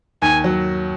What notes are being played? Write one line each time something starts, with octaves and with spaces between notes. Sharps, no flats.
D#2 G#5
F#3